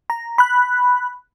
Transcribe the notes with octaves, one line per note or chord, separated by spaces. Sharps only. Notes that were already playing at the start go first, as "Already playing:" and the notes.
A#5
B5 F#6